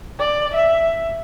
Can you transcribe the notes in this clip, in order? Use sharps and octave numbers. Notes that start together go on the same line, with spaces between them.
D5
E5